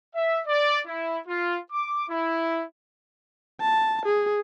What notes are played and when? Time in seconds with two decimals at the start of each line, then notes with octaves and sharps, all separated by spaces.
0.15 E5
0.47 D5
0.87 E4
1.28 F4
1.72 D6
2.09 E4
3.61 A5
4.05 G#4